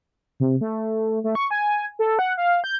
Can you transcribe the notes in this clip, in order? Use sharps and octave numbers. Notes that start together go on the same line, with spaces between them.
C3
A3
A3
C#6
G#5
A4
F#5
F5
G6